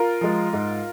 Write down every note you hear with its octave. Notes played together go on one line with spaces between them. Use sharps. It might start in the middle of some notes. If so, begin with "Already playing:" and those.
Already playing: F4 A#4
F3 G#3
G#2